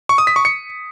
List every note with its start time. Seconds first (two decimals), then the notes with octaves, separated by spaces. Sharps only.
0.09 C#6
0.18 D#6
0.27 B6
0.36 C#6
0.45 C#7